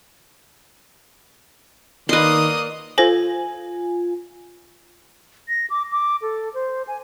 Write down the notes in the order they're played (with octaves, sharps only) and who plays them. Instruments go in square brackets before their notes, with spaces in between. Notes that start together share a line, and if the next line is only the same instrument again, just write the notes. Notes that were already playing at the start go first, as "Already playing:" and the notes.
[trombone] D#3 [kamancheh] A#3 D5 [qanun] B4 C6 [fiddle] D#5 D#6
[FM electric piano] F4 G#5 [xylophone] A4 C5 A#6
[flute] A#6
D6
D6
A4
C5
G#5